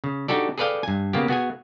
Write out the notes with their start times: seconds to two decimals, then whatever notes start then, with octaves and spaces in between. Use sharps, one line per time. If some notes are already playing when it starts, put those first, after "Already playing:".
0.04 C#3
0.28 D4 D#4 F#4 G4 A4 D5
0.58 G#4 A4 B4 D5 F5 G5
0.83 G2 G#5
1.13 C#3 A#3 B3 G4
1.28 B3 F#4 G#4 G#5